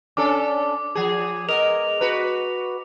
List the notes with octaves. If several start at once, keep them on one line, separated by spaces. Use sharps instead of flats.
C#4 D4 A4 D6
F3 G#4
G#3 B3 A#4 D#5 F7
F#4 B4